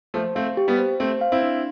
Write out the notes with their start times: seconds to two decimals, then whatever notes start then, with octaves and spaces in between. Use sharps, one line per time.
0.14 F3 A3 C5
0.35 A3 C4 F5
0.57 G4
0.68 G3 B3
0.78 C5
1.00 A3 C4 C5
1.21 F5
1.32 C4 E4
1.43 D4